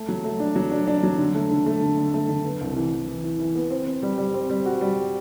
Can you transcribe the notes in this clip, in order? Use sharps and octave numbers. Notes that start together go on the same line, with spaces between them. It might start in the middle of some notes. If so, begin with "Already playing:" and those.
Already playing: A3
F#3
A3
D4
F#3
D4
D4
F#3
D3
A3
D3
A3
D3
D3
A3
D3
B3
C2
E3
E3
E3
E3
E3
B3
C4
C4
G3
G3
C4
G3
F#4
G3